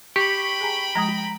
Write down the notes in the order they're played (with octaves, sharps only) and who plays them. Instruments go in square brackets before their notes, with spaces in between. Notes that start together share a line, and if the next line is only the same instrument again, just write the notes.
[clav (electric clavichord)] G4 [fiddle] G5 B5 [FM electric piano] C#6
[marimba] G#4 G#5 A#5
[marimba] F3 G#3 D#6 [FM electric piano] A#5